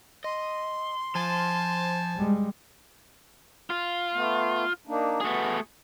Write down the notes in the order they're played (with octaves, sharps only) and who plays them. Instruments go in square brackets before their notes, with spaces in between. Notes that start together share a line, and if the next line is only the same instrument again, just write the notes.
[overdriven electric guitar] D#5 [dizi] C6
[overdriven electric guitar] F3 [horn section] C5 G#5 A5
[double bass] G3 G#3
[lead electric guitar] F4
[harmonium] A3 B3
A#3 D4 D#4
[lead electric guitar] A3 G#4 [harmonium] B3 F#4